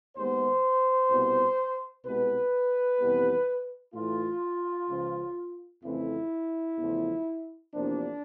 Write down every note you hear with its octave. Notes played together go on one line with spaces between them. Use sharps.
D#2 D#3 G#3 B3 C5
C2 B2 G3
C2 B2 G#3 B3 B4
F2 C3 E3 G3 B3
A2 E3 A3 F4
C#2 C#3 F3
F2 C#3 E3 A3 C4 E4
E2 C#3 F3 A3
E2 C3 F3 A#3 D4